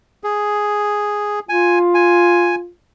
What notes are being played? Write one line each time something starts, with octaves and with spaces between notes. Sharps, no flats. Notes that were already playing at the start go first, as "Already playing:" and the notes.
G#4
F4 G#5
G#5